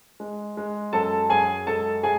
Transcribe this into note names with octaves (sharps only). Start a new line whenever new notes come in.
G#3
G#3
F#2 A4 A5
F#2 G#4 G#5
G#3 A4 A5
G#3 G#4 G#5